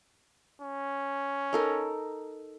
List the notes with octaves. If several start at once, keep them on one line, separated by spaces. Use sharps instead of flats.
C#4
D#4 A4 A#4